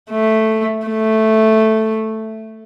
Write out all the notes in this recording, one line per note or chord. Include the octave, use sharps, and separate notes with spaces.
A3
A3